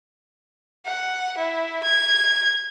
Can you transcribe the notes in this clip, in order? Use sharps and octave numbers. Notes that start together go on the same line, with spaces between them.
F#5
E4
G#6